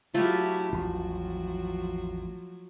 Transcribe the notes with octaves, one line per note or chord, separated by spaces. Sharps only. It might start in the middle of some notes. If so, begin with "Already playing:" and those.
F#3 A3 E4 F4 G4
A1 E2 F3 F#3